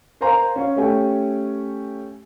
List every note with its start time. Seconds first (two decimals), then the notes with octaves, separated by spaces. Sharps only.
0.21 A#4 C5 F5 G#5 A#5 C6
0.56 C#4 F5
0.76 A3 C#4 G4 G#5